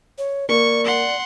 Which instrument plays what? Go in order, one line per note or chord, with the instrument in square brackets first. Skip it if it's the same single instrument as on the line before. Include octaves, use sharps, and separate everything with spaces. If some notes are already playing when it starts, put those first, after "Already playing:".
[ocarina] C#5
[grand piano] A#3 [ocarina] D5 [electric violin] C#6
[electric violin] F#5 C6